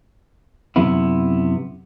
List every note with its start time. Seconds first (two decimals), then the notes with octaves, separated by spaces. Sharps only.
0.76 F#2 C3 B3 E4